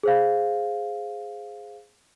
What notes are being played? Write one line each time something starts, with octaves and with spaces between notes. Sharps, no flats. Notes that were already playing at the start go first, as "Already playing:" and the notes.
G#4 C5 F5